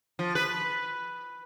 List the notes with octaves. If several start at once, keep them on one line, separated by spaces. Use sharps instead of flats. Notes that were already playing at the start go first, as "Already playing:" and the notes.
F3
B4